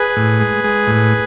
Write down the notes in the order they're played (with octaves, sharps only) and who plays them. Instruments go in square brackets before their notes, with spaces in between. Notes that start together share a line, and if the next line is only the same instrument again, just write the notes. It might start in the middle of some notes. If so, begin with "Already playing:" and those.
Already playing: [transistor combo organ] G#4 B4
A2
G#3
G#3
A2